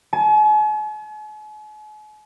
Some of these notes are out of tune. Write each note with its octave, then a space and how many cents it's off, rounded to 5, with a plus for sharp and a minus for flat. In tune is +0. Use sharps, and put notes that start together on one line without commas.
G#5 +45